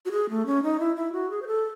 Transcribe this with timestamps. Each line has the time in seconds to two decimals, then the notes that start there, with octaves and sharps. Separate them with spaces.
0.06 F#4
0.12 G#4
0.29 A3
0.46 C#4
0.63 D#4
0.80 E4
0.96 E4
1.13 F#4
1.30 G#4
1.42 C5
1.47 A4